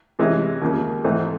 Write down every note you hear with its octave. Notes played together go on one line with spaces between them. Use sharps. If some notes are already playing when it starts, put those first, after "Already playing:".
C3 E3 G#3 C#4
D#2 C#3 F3 A#3
G#2 E3 A3 C4 D#4